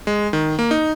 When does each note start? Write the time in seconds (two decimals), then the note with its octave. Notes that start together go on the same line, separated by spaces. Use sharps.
0.07 G#3
0.33 D#3
0.59 A#3
0.71 D#4